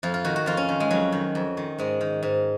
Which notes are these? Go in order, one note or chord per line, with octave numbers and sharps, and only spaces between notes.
F2 F4
F4
D#3 F#4
F#4
F2 F4
C#4
D#3
G#3
F2 F#3
D#3
F2
D#3
G#2 G#3
D#3
G#2